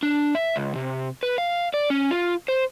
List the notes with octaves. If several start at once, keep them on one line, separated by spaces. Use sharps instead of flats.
D4
E5
C#2
C3
B4
F5
D5
C#4
F4
C5